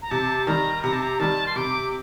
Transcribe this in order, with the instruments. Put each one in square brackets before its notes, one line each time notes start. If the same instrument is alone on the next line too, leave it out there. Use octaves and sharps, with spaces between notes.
[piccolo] A#5
[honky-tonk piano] C3 [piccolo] A5
[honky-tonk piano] D#3 G3 [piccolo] A#5
[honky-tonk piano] C3 [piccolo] A#5
[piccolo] A5
A#5
[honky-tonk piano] D#3 G3 [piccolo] A5
[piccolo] C6
[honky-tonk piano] C3 [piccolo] D6